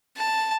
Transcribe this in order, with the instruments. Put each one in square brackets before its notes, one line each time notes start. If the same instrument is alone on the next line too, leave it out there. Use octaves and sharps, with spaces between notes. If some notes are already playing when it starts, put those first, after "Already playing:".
[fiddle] A5